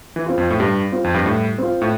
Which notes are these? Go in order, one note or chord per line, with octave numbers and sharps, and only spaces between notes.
E3
C4 F4
F2
A2
G2 G3
C4 F4
F2
G2
A2 G3
C4 F4
A2